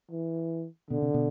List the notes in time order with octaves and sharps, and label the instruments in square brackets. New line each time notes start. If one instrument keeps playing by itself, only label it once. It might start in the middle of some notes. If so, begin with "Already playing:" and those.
[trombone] E3
[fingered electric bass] B2 [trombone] D3
[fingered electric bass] C3
B2